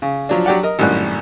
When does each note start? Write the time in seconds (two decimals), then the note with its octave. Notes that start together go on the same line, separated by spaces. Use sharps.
0.02 C#3
0.29 F3 F#3 D4
0.46 F#3 D4 G4 D5 F#5
0.63 A#4 D#5
0.79 G#1 F#2 A2 G3 F#6